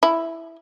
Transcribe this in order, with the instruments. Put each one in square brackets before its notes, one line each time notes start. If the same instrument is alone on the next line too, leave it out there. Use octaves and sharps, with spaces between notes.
[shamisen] E4